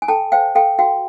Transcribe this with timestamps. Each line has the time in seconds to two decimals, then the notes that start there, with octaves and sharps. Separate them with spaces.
0.02 G#5
0.08 A4 G5 A5
0.32 C5 F5 G5
0.55 A4 F5 G5
0.79 F#4 F5 G5